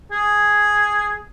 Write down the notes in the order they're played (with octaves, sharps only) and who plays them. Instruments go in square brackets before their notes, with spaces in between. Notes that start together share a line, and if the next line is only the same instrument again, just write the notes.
[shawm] G#4